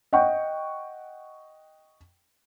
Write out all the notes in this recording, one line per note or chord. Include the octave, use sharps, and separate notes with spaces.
D#5 F#5 G5 C#6